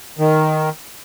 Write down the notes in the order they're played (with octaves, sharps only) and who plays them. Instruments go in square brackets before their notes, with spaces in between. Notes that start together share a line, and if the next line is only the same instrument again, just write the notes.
[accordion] D#3